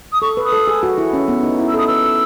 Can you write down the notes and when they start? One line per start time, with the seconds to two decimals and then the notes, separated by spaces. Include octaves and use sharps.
0.13 D#6
0.22 A4 C#6
0.37 B4
0.45 D#6
0.52 A4
0.68 G#4
0.83 F#4
0.98 E4
1.13 C#4
1.28 B3
1.43 D#4
1.59 E4
1.68 E6
1.74 A4 D#6
1.87 B4 E6
2.05 A4